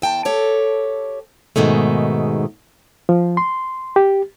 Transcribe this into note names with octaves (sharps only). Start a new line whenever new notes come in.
E2 G5 A5
G4 A4 C#5
G#2 B2 D#3 G#3 A3
F3
C6
G4